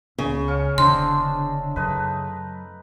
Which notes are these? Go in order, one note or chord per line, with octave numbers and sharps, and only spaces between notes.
C#2 C#3
C#4 F5 C#6
E1 D3 G#3 C4 D4 C6
F#2 A3 D#4 B4